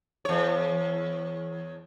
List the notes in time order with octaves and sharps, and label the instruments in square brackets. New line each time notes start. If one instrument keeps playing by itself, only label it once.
[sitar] E2 C#5